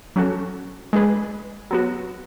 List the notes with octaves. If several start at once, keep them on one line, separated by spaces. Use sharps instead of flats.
F#3 C#4 F#4 A4
G#3 D4 G#4 B4
F#3 B3 F#4